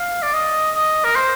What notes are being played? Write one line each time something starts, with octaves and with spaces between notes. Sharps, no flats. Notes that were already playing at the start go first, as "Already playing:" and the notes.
Already playing: F5
D5
D#5
D#5
A#4
C5